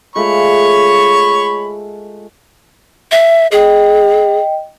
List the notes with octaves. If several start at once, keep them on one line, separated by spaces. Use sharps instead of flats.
G#3 A3 F4 C#5 B5 C#6
E5
G#4 D#5 G5